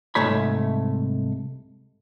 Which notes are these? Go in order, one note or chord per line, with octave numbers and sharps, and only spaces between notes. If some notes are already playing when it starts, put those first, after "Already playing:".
C2 G#2 A3 C#5 B5